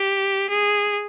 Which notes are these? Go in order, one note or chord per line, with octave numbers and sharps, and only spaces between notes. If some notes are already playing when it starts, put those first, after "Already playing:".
Already playing: G4
G#4